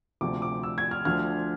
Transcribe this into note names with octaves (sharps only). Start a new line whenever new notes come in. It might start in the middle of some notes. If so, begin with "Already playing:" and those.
D2 C3 F3 D6
D6
E6
G#6
F6
D2 D3 F3 F6